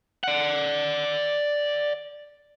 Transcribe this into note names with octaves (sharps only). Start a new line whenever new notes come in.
D5 F#5